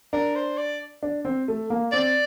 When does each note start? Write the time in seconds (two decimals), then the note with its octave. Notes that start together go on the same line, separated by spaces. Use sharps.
0.13 D4 A#4
0.36 C5
0.58 D5
1.03 D4
1.25 C4
1.48 A3
1.70 A#3
1.92 C4 D5